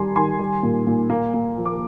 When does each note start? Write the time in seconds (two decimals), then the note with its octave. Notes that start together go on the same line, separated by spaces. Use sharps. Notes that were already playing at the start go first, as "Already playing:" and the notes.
Already playing: D#3 G3 G#5 A#5 C6
0.16 D#3 G#5 C6
0.39 G3
0.63 A#2
0.87 A#2
1.10 A#3
1.34 A#3
1.58 F3
1.65 D6